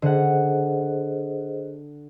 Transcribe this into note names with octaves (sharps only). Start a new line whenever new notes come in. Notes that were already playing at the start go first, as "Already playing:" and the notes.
D3 G#4 C5 D#5 F#5